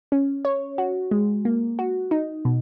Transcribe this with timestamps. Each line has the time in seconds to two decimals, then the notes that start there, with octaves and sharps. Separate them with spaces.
0.12 C#4
0.45 C#5
0.78 F#4
1.11 G#3
1.45 A#3
1.79 F#4
2.11 D#4
2.45 B2